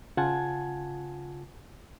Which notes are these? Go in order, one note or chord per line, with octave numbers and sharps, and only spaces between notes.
C#3 F4 F#5 G#5 A5 G#6